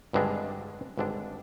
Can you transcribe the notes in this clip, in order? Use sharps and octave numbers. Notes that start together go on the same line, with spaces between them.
G#1 G2 D3 G#3 D4
G#1 G2 D3 G#3 D4